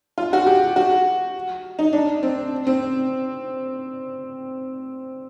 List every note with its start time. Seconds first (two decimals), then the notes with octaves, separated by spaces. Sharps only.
0.18 F4
0.33 F#4
0.47 G4
0.76 F#4
1.79 D#4
1.93 D4
2.23 C4
2.67 C4